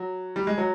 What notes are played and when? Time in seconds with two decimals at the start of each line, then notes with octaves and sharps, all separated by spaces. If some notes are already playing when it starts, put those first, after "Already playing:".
Already playing: F#3
0.36 G3
0.47 G#3
0.58 F#3